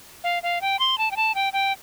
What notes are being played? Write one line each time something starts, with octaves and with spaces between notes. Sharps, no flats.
F5
F5
G5
C6
A5
G5
A5
G5
G5